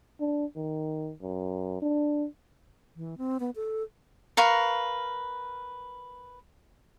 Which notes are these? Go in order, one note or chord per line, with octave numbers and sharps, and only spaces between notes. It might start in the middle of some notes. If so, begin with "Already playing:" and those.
D4
D#3
F#2
D4
E3
C4
B3
A4
A#4 B4 F5 C#6